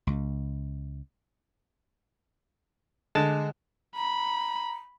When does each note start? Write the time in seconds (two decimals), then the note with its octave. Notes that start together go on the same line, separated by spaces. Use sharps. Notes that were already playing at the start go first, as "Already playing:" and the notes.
0.07 C#2
3.15 D3 G#3 A5
3.96 A#5 B5